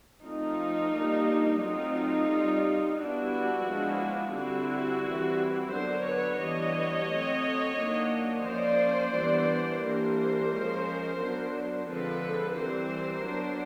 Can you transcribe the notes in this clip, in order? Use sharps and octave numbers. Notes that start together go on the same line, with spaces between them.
F3 A3 C4 D#4 F4
G3 A#3 D4
F#3 A3 C4 D#4 F4
G3 C4
G3 B3 D4 E4 F#4
F3 G#3 B3 D4
D3 G3 C4 E4 F#4
E3 G3 C4
D3 F#3 B3 D4 A#4 C5
B4 C#5
E3 G3 B3 D4 C#5 D#5
F#3 A3 C4
D#3 F#3 A#3 D4
F3 A#3 C#4 C5 D5
E3 G3 B3 D4
E3 G3 A#3 D4 A#4 C5
F3 G#3 C#4
F#3 B3 D4
D3 F3 G#3 C4 A4 B4
E3 G3 C4 A#4 C5
F#3 B3 D4